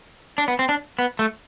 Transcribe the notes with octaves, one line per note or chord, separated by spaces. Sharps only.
D4
B3
C4
D4
B3
A3